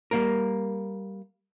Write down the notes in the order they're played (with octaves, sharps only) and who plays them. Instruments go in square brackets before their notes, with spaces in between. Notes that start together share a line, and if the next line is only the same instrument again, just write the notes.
[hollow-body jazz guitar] G3 A#3 A#4